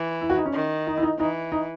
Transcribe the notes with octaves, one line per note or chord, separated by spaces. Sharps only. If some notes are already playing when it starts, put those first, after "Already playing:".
Already playing: E3
E4
F#4
D#4
C#4
D#3
D#4
E4
D#4
E3 D#4
D#4